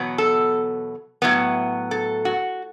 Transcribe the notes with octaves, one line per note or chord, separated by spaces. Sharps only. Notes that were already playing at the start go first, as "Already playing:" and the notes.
Already playing: E2 B2 F#3 B3
A4
A2 F#3 B3
A4
F#4